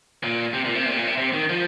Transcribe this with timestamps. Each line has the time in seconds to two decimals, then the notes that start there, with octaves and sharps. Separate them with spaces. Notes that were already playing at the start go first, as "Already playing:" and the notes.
0.23 A#2
0.54 C3
0.65 A#2
0.75 C3
0.85 A#2
0.91 C3
0.97 A#2
1.07 C3
1.18 C3
1.33 D#3
1.49 F3